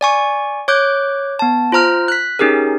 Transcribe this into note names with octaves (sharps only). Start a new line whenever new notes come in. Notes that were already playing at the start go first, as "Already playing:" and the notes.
D5 G#5 C#6
C#5 D6 F#6 G6
B3 A5
F4 C5 A#5 F6
F#6 B6
C#4 D#4 G4 G#4 A#4